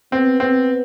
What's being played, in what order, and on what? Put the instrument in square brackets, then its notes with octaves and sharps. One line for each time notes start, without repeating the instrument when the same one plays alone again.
[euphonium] B3 [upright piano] C4
[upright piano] C4